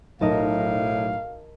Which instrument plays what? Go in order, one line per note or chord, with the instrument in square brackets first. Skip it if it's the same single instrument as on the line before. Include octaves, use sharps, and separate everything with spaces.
[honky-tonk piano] B1 [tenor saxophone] A2 [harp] A#4 D#5 A5 [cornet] F5